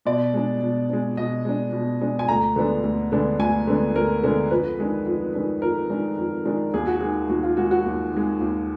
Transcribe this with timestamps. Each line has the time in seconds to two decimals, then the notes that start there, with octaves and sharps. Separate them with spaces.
0.05 B2 D5
0.34 G#3 D4
0.61 B2
0.89 G#3 D4
1.17 B2 D#5
1.45 G#3 D4
1.73 B2
2.01 G#3 D4
2.19 G#5
2.28 D2 A#5
2.56 D3 G#3 B3 D4
2.84 D2
3.12 D3 G#3 B3 D4
3.40 D2 G#5
3.67 D3 G#3 B3 D4
3.95 D2 A#4
4.23 D3 G#3 B3 D4
4.51 F2 B4
4.79 D#3 G#3 D4
5.06 F2
5.34 D#3 G#3 D4
5.62 F2 A#4
5.90 D#3 G#3 D4
6.18 F2
6.45 D#3 G#3 D4
6.74 D#2 G#4
6.87 F#4
7.00 D#3 G#3 G#4
7.29 D#2 F#4
7.43 F4
7.57 D#3 G#3 F#4
7.71 F#4
7.85 D#2
8.12 D#3 G#3
8.41 D#2